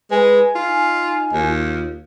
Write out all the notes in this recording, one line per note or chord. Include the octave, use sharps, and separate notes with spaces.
G#3 B4 G#5
D#4 F4
D#2 F4